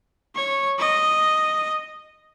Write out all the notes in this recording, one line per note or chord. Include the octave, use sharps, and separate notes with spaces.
C#5
D#5